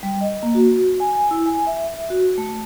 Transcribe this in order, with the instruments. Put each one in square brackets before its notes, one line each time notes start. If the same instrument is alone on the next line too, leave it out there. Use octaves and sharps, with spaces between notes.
[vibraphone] G3
D#5
A#3
F#4
G#5
E4
G#5
E5
F#4
A3